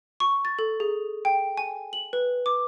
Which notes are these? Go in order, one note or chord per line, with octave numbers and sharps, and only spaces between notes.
C#6
A6
A4
G#4
G5
G#5
F#7
B4
D6